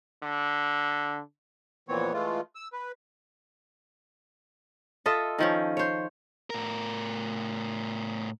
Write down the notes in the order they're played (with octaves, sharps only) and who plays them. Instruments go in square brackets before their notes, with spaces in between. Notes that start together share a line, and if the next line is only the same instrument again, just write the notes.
[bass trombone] D3
[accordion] F2 A#2 E3 B3 C4 C#5
E3 G#3 A3 F4
E6
B4
[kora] F4 A4 D#5 E5
D#3 F3 C#4
C5 C#5
[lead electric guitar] A2 A#4